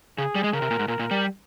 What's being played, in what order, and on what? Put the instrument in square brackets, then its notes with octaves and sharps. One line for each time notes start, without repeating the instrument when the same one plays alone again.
[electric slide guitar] C#3 [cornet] G#4
[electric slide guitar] G3
G#3
[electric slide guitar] C#3 [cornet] A#4
[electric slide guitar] C3
A#2
G#2
[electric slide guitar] A#2 [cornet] A#4
[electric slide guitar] A#2
G3